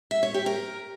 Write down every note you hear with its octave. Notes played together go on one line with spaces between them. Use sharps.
E5
C#5
G4
A#4